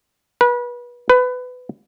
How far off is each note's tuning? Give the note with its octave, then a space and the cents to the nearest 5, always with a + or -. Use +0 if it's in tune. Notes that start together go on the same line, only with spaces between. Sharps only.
B4 -30
B4 +20